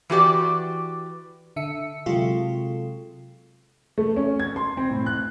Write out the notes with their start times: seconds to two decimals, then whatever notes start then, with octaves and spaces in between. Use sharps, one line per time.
0.10 E3 F#4 G4 D5
1.56 D3 E5 C#7
2.06 C3 F#3 G#3 F4 A4
3.98 A3
4.17 C#4
4.40 G#6
4.56 C6
4.77 C4
4.91 A2
5.06 F#6